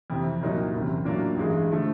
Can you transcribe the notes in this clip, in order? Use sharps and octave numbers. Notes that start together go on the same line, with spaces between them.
F2 C3 E3
C2 A#2 F#3 A#3 D#4
F#1 E2 C3
A2 F#3 A#3 D4 F4
A1 G2 E3 G#3
D3 F3 A3